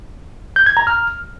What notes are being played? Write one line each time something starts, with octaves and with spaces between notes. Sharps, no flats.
G6
G#6
A#5
F6